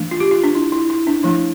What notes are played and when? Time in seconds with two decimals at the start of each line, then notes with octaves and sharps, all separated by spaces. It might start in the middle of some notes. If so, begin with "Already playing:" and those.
Already playing: E3 A3 D4
0.11 F4
0.20 G4
0.31 F4
0.44 D4
0.55 E4
0.72 E4
0.90 E4
1.07 D4
1.23 F3 A3 D4 E4